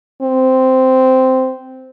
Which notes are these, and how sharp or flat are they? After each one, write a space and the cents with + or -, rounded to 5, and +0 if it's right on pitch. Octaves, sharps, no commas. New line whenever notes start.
C4 -10